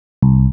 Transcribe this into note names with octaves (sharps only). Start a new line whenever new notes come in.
C2